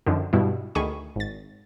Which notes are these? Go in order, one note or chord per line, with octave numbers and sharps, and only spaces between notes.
F#2 D3 D#3 F3
G2 B2 G3 E4
D2 D#3 G#4 B5 C#6 D#7
G#1 A6